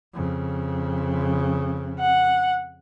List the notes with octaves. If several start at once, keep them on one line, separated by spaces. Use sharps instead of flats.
F2 C#3
F#5